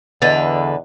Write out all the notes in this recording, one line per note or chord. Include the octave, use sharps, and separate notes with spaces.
E2 D3 B4 D#5 A6